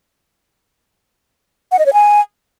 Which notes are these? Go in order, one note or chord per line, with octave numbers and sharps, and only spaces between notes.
F#5
D#5
C#5
G#5